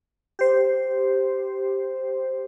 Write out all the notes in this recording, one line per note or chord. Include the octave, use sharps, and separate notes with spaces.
G4 C5